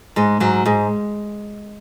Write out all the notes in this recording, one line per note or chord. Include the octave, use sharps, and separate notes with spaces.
G#2 G#3
G#2 F#3
G#2 G#3